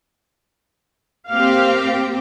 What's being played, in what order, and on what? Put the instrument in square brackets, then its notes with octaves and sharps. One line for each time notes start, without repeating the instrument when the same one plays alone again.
[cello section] A#3 C4 G4 [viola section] F5